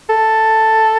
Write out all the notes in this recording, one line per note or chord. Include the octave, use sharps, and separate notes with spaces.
A4